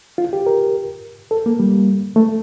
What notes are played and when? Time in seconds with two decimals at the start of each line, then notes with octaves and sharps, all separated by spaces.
0.18 F4
0.33 G4
0.46 A#4
1.31 A4
1.46 A#3
1.60 G3
2.16 A3